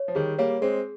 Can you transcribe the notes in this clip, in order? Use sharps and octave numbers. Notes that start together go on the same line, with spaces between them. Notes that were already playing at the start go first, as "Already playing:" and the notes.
Already playing: C#5
F3
D#3 G3 G#4
G3 A#3 C#5
G#3 C4 G#4